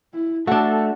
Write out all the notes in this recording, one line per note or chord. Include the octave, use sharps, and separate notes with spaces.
E4
A3 D4 F#4 A4